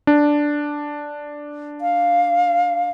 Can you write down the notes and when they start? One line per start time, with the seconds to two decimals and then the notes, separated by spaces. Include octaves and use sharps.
0.07 D4
1.81 F5